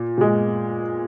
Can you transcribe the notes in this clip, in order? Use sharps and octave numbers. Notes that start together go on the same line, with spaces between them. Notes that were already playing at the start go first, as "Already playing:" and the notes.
Already playing: A#2
A#2 G#3